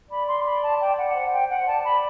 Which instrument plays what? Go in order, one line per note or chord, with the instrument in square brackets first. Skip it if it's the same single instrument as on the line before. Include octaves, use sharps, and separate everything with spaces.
[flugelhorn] D5 [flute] B5
[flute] C6
B5
A5
G5
F#5
[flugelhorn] C5 [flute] F#5
[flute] G5
F#5
[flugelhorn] D5 [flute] A5
[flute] B5